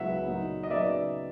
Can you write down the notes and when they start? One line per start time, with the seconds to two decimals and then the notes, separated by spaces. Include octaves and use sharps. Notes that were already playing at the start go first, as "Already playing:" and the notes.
Already playing: C#2 C#3 F#3 B3 E4 E5 F#5
0.28 A#2 F#3 A#3 D#4
0.63 D#5
0.70 C#3 F#3 B3 D#4 D5 E5